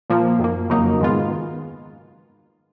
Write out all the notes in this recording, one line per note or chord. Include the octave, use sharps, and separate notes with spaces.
A#2 F3 A#3
F#2 D#3 A#3
F2 C#3 F#3 A#3 D#4
G#2 D#3 G#3 B3 F4